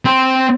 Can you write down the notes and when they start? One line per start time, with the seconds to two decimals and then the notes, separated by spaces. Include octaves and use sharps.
0.05 C4